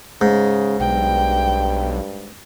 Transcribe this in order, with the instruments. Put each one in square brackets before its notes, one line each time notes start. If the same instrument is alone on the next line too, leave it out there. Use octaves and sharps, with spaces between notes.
[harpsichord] G#2 [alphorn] C#3
[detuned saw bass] B1 [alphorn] G2 [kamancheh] G5